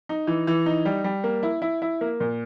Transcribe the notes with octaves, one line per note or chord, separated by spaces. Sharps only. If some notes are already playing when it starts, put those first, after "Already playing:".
D#4
E3
E3
D#4
G3
G3
A#3
E4
E4
E4
A#3
A#2